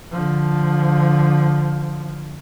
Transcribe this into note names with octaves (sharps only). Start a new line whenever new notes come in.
D3 F3